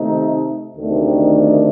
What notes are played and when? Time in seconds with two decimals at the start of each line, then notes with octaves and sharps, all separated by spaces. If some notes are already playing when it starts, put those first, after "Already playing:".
Already playing: C3 D#3 A3 D#4
0.76 D2 C3 D#3 A3 D4